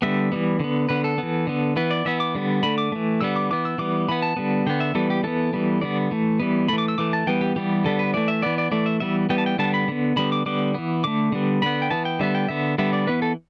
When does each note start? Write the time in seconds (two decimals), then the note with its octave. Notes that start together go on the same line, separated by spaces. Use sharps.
0.02 D3 G3 B3 E5
0.32 E3 G3 B3
0.60 D3 B3
0.89 D3 B3 B4
1.04 A4
1.18 E3 B3
1.47 D3 B3
1.76 E3 B3 B4
1.91 D5
2.05 E3 B3 E5
2.20 D6
2.35 D3 G3 B3
2.63 D3 A3 B5
2.78 D6
2.92 E3 A3
3.21 D3 G3 B3 E6
3.36 D6
3.51 E3 B3 D6
3.65 E6
3.78 E3 G3 B3 D6
4.09 E3 B3 B5
4.22 A5
4.37 D3 G3 B3
4.67 D3 B3 G5
4.80 E5
4.95 E3 G3 B3 A4
5.10 G4
5.23 E3 B3 A4
5.53 E3 G3 B3
5.81 D3 G3 B3 D5
6.11 E3 A3
6.40 E3 G3 B3
6.68 E3 A3 B5
6.78 D6
6.88 E6
6.98 E3 A3 D6
7.13 A5
7.27 E3 G3 B3 G5
7.41 G4
7.56 E3 G3 B3 G4
7.84 D3 G3 B3 A4
7.99 B4
8.14 E3 A3 D5
8.28 E5
8.42 E3 B3 D5
8.58 D5
8.72 E3 A3 D5
8.86 E5
9.00 E3 G3 B3 E5
9.29 E3 G3 B3 G5
9.38 A5
9.46 G5
9.59 D3 G3 B3 A5
9.74 B5
9.88 D3 B3
10.16 D3 G3 B3 B5
10.32 D6
10.46 D3 G3 B3 D6
10.75 E3 B3
11.04 D3 A3 D6
11.32 D3 G3 B3
11.62 D3 B3 B5
11.82 G5
11.90 E3 B3 A5
12.05 G5
12.19 D3 G3 B3 E5
12.35 G5
12.48 D3 B3 E5
12.78 D3 G3 B3 E5
12.93 D5
13.07 E3 B3 B4
13.22 A4